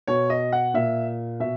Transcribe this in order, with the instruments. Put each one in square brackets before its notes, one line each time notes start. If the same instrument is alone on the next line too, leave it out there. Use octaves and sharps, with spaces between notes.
[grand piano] B2 C#5
D#5
F#5
A#2 E5
B2 E5